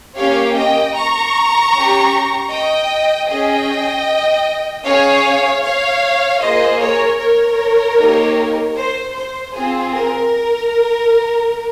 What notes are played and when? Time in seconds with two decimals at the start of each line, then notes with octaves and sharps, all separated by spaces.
0.16 A#3 C#4 G4 C#5 F5
0.55 D#5 G5
0.94 A#5 C#6
1.72 C#4 G4
2.50 D#5 G5
3.28 C#4 G#4 D#5 G5
4.85 C#4 G#4 C#5 F5
5.63 C#5 F5
6.40 A#3 F4 G#4 C5 D#5
6.79 A#4 C#5
7.18 A#4 C#5
7.97 A#3 D#4 G4
8.76 C5
9.14 C5
9.53 C4 F4 G#4
9.92 A#4